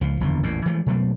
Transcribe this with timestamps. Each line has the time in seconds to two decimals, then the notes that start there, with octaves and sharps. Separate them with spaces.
0.01 C#2 F3
0.20 F#1 E2 D3 F3
0.43 A1 E2 A#2
0.66 E3 F3 G#3 A3
0.86 B2 F#3 A3 A#3